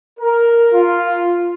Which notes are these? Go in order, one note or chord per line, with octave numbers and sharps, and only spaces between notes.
A#4
F4